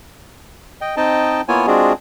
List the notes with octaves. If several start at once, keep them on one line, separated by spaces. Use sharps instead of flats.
D#5 G5
C4 D#4 D#5 G5 A5
A#3 B3 E4 F4 C#5 G#5
G#3 C4 D4 F4 F#4 G#4